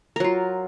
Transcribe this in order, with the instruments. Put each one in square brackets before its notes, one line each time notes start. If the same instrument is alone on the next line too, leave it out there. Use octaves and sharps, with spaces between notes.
[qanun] A#4
F#3
F4